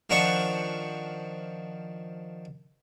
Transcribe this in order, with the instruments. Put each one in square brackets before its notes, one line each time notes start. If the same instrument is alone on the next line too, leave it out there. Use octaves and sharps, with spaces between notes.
[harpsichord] D#3 F3 D4 F#5 C#6